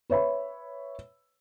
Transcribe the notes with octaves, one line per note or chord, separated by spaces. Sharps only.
B4 C#5 E5 B5